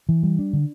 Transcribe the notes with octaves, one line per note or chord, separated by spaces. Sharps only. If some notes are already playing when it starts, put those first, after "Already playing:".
E3
G3
D4
D3